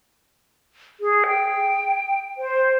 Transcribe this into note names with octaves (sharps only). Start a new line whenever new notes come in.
G#4
G5
C5